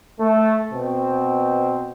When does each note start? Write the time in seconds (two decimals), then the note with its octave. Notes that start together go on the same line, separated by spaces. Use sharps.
0.20 A3
0.72 B2 C4